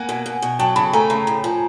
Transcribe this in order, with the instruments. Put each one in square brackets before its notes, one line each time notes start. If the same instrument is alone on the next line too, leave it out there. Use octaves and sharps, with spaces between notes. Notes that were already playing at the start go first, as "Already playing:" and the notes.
Already playing: [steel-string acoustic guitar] A#3 [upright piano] F#5 G#5
[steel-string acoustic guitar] B2
B2
B2
[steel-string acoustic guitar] F#3 [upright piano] G5 A5
[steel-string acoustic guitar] C#3 [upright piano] A5 B5
[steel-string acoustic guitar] A3 [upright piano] G#5 A#5
[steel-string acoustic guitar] C#3
A2
F3